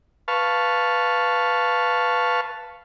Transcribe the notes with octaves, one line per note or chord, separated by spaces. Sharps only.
B4 F5 A5 C#6